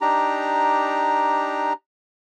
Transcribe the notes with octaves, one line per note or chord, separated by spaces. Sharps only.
D4 D#4 G4 A#5